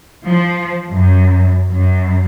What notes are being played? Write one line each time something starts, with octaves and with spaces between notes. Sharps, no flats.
F3
F#2
F#2